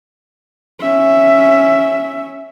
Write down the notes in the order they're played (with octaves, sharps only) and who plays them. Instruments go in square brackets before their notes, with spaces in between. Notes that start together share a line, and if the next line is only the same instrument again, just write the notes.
[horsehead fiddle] C#4 E5